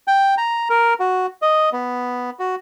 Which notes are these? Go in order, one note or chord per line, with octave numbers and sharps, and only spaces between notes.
G5
A#5
A#4
F#4
D#5
B3
F#4